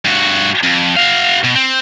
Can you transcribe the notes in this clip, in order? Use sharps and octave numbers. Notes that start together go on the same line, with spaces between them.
G2 F#4
F2
F#4 F5
B2
C4